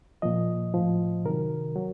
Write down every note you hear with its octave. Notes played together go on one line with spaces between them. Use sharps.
A#2 F3 D#5
A2 F3
C3 D#3 F#3 A#4
F#3